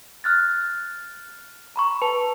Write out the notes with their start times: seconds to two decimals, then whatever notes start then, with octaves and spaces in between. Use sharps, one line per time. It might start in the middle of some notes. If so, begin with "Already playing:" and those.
0.24 F6 F#6 A6
1.76 A#5 B5 C#6
2.02 B4 A5